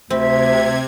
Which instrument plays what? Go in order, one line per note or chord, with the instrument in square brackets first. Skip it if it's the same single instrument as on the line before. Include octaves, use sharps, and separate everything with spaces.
[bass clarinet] D2 [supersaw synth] C3 G#6 [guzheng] C4 [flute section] E5